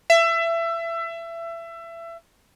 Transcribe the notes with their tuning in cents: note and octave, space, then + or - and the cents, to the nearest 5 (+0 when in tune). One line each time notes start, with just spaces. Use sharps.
E5 +25